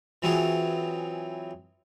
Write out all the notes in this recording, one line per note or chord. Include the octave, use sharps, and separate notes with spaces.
E3 F#3 C4 F4 G#4